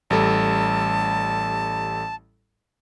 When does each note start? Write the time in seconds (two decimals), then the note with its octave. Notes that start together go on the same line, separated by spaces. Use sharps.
0.10 A1 G3 A4 A5